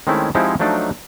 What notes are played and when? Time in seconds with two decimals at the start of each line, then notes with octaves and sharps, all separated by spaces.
0.07 D#3 G#3 A3 C4 C#4 E4
0.35 F3 G#3 C4 D#4 E4 G4
0.60 F3 F#3 A3 D4 D#4 D5